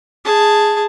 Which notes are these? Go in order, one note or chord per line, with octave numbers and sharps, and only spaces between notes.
G#4 A5